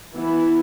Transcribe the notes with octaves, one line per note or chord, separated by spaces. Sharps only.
E3 B3 E4